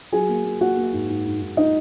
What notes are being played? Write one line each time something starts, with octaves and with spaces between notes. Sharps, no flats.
F#3 G#4 G#5
A#3
A#3
A#3 F#4 F#5
A#3
G#2
G#2
G#2
G#2
D#4 D#5